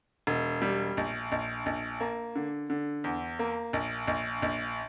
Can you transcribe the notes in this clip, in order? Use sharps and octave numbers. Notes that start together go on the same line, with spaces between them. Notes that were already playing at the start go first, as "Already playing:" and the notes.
E1
G3
A#1
A#1
A#1
A#3
D3
D3
E2
A#3
A#1
A#1
A#1